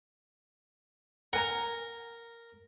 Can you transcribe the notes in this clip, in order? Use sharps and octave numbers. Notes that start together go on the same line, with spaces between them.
A#4 F#5 G#5 A#5